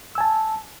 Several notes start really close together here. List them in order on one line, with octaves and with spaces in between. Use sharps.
E6 G#5 A5